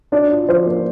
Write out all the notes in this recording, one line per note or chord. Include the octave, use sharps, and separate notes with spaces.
D4 D5
F4
F3 C5
A#3